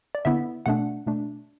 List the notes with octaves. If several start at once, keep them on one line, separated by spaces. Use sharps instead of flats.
D5
D3 B3 E4 E5
B2 A3 D4 F#5
B2 A3 D4